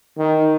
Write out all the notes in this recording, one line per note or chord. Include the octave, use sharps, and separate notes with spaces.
D#3